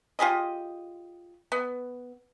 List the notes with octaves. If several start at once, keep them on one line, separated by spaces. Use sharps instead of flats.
F4 G4 G#4 D#5
B3